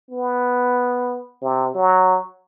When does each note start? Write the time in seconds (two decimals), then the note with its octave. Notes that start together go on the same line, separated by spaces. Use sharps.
0.11 B3
1.42 C3
1.75 F#3